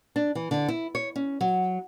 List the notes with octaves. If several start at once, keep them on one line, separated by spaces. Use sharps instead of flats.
D4
E3
D3
E4
C#5
C#4
F#3